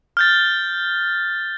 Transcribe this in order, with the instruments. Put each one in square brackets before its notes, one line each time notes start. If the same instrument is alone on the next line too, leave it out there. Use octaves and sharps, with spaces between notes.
[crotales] F6 G6 A6